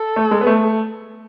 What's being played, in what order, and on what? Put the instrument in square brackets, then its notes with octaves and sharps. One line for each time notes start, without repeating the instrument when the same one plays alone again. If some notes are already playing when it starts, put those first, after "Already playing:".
Already playing: [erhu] A4
[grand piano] A3
G#3
B3
A3